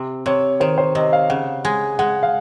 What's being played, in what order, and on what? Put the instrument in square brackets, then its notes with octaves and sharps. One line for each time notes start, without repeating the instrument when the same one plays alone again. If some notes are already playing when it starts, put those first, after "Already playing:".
Already playing: [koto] C3
[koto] C3 [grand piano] C#5
[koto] D#3 [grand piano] C5
[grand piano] C5
[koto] C3 [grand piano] D#5
[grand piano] F5
[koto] C#3 [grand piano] F#5
[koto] G#3 [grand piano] G#5
[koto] G#3 [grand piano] F#5
[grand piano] F5